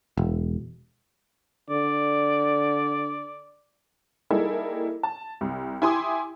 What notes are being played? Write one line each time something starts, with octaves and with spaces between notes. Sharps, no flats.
E1
D3 D5
G3 A#3 D#4 E4 G#4 A4
A5
C2
E4 G4 G#5 C6 D6 D#6